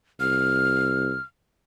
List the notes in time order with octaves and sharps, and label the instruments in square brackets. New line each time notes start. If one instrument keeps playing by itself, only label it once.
[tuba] C2 [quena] F6